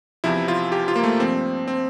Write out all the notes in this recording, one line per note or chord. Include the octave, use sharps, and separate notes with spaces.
E2 C3 F3 E4
F4
G4
F4
A#3
A3
G2 F3 C4
C4